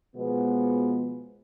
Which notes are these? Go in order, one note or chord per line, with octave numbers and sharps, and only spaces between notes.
B2 F3 G#3 B3